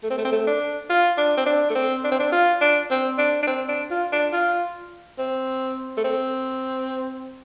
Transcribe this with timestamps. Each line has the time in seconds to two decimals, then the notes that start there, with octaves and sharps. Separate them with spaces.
0.03 A3
0.10 C4
0.18 A3
0.25 C4
0.32 A3
0.47 D4
0.90 F4
1.18 D4
1.37 C4
1.46 D4
1.70 A3
1.75 C4
2.04 D4
2.11 C4
2.19 D4
2.32 F4
2.61 D4
2.90 C4
3.18 D4
3.43 D4
3.47 C4
3.68 D4
3.90 F4
4.12 D4
4.33 F4
5.18 C4
5.97 A3
6.04 C4